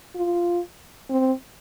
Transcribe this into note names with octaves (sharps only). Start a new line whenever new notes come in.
F4
C4